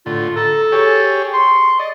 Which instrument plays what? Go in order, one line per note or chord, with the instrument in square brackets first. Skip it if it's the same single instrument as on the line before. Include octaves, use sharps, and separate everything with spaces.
[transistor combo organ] A2 D3 [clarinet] F4
[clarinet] A4 [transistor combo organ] A#5
[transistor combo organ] G4 G#4 C#5
[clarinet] C6 [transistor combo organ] C#6
[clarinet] D5 [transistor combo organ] D#5